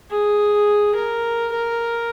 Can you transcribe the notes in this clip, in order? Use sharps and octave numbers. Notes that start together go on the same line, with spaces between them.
G#4
A#4
A#4